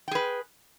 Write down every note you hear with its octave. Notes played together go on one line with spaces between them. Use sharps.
G#4 B4 G5